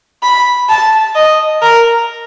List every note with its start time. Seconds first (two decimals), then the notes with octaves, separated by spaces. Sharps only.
0.23 B5
0.69 A5
1.15 D#5
1.62 A#4